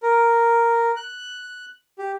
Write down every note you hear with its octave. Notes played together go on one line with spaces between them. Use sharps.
A#4
F#6
G4